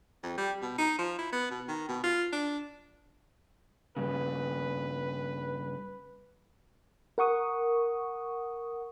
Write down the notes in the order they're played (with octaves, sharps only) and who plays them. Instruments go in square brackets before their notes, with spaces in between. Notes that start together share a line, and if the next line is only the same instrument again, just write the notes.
[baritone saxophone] F2
G3
B2
D#4
F3
E4
B3
B2
D#3
B2
F4
D4
[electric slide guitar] G2 C#3 [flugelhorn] B4
[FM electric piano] A#4 F#5 C#6 D#6